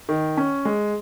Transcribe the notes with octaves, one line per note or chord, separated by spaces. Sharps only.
D#3
C#4
G#3